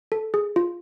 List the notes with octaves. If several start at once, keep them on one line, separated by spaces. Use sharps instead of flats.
A4
G#4
F4